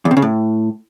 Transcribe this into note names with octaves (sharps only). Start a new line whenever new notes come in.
E2
C3
C#3
A2